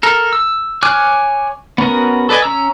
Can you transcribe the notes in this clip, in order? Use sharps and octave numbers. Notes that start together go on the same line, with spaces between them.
A4 A#4
E6
C#5 G#5 D6 F6 F#6
B3 C#4 F#4 A#4
A4 B4 D5 D#5 G#5
C#4 A#5 E6